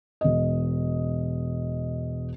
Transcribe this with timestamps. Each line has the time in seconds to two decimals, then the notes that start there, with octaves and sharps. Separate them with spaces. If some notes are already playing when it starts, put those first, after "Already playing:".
0.21 E1 D#5